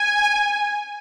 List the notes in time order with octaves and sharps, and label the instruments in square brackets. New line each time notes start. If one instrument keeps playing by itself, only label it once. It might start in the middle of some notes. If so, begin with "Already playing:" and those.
Already playing: [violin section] G#5